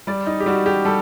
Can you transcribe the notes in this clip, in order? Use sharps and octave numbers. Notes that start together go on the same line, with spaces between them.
G3 D5
D#4
G4
G3 F#4
G4
G3 A4